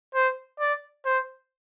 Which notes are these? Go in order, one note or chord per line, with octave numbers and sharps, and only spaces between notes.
C5
D5
C5